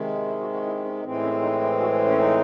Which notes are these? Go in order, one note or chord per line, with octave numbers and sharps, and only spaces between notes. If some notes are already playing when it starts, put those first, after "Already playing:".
Already playing: C3 D#3 G#3
E4
F#4
F#4
E4
C#4
A2 E3 G#3 C4
C#4
D#4
E4
F#4
C#4
D#4